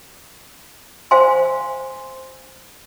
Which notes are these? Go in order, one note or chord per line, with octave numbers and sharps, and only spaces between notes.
C5 F5 G#5 C6